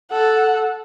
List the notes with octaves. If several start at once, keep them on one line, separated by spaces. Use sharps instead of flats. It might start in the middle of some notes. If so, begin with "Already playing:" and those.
A4 F#5